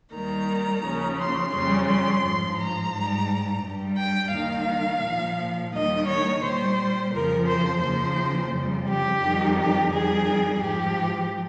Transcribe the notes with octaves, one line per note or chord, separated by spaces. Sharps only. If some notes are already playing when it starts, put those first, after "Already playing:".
D#2 D#3 G3 A#5
D#2 C#3 F3
C6
F2 C#3 G3 C6
C6
G#2 F3
A#5
G#2 G3
G2 G3
G5
D#2 D#3 G3 F5
A#2 F3
D#2 D#3 G3 D#5
C#5
A#2 G3 C5
F2 C#3 F3 A#4
C5
D#2 C#3 F3 C5
F2 C#3 G3
G4
F2 D#3 G3
G4
F2 D#3 G3 G#4
G#2 F3 G4